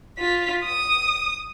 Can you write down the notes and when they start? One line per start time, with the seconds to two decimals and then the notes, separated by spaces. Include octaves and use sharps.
0.18 F4 B6
0.64 D#6